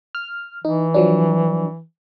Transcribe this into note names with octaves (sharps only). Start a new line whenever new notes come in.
F6
E3 D#4
F3 F#3 D4